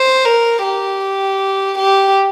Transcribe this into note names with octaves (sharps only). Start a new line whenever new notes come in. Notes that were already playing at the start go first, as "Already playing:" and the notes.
Already playing: C5
A#4
G4
G4